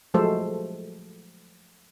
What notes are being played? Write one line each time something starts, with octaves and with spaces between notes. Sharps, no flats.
F3 F#3 G#3 A3 A4 C5